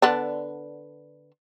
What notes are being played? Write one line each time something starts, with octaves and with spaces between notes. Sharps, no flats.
D3 B3 D4